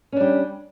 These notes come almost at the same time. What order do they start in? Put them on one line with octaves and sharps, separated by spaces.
C#4 D4 G3